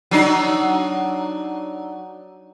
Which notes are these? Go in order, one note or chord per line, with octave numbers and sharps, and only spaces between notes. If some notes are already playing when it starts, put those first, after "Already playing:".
F#3 D4 D#4